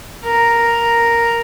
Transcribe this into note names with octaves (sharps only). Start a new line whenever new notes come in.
A#4